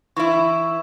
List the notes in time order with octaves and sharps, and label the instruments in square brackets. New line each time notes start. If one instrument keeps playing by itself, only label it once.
[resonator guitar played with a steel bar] E3 E4 [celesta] C#6